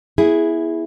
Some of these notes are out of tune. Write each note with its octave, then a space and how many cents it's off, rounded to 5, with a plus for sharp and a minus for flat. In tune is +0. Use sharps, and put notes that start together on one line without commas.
B3 -10 E4 +0 G#4 +0